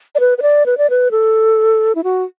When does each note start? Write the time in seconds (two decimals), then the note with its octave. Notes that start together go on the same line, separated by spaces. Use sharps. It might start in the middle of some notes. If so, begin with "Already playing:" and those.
0.15 D5
0.20 B4
0.38 B4
0.42 D5
0.66 B4
0.78 D5
0.90 B4
1.11 A4
1.95 E4
2.04 F#4